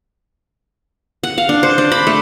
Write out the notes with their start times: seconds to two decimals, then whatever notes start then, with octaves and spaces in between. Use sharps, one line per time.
1.23 F#5
1.38 F5
1.49 D4
1.63 C5
1.78 D4
1.92 B5
2.07 A3